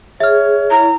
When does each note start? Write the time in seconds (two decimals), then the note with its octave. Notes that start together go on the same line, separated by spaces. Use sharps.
0.20 G#4 C#5 E5 F6
0.71 E4 A#5